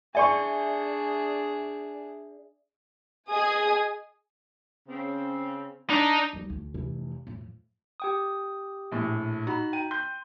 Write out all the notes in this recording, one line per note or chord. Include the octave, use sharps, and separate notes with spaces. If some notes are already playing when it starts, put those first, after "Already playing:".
D4 G#4 D5 E5 G#5 C#6
G#4 D#5 G#5 D#6 G#6
C#3 C4
D4 D#4
G3 D#4
D2
F1 E3
F2 A2
G4 G5 D#6
A#1 A2
D#4 F#4 B5
G5 D#7
C6 G6